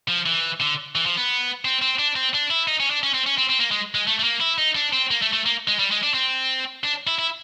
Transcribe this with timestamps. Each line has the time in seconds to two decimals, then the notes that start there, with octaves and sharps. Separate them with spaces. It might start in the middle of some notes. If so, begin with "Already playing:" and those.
0.08 F3
0.26 E3
0.61 D3
0.95 E3
1.06 F3
1.17 B3
1.65 C4
1.81 C4
1.99 D4
2.16 C4
2.34 D4
2.50 E4
2.68 D#4
2.80 C#4
2.91 D4
3.03 C#4
3.14 C4
3.26 C#4
3.38 C4
3.49 C4
3.60 A#3
3.71 G#3
3.95 G#3
4.07 A3
4.19 A3
4.24 A#3
4.41 E4
4.58 D#4
4.75 D4
4.93 C4
5.11 A#3
5.22 A3
5.33 A3
5.46 A#3
5.68 G#3
5.79 G3
5.91 G#3
6.03 D4
6.14 C4
6.84 D4
7.07 E4
7.19 E4